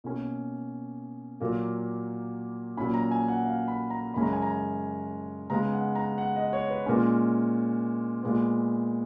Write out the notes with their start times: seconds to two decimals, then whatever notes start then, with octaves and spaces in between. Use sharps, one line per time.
0.04 B2 A#3 C#4
1.40 A#2 F#3 A#3
2.77 A#2 F#3 C#4 B5
2.94 A#5
3.11 G#5
3.28 F#5
3.45 F5
3.68 B5
3.90 A#5
4.14 F#2 C#3 G#3 C#4 B5
4.23 A#5
4.33 G#5
4.42 A#5
5.50 C#3 G#3 B3 A#5
5.73 F#5
5.96 A#5
6.18 F#5
6.36 D#5
6.53 C#5
6.70 B4
6.86 A#2 G#3 C#4 A#4
8.23 A#2 G#3 B3